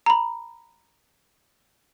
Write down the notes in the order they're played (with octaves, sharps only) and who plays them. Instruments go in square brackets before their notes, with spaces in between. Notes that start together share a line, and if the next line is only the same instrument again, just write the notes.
[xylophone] A#5 B5